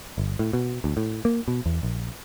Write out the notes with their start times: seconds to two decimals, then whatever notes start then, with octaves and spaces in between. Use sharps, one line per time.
0.18 G1
0.39 A2
0.53 B2
0.84 D2
0.97 A2
1.25 A#3
1.48 B2
1.66 E2
1.83 A#1